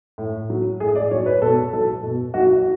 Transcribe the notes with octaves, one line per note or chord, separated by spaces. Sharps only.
A2
F#3
A2 G#4
D5
F#3 C#5
B4
B2 A4
F#3 A4
B2
F#3 F#4
F#4